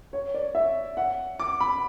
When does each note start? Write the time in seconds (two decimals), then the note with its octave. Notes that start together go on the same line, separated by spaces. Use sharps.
0.13 C#5
0.34 D5
0.55 E5
0.97 F#5
1.39 D6
1.60 B5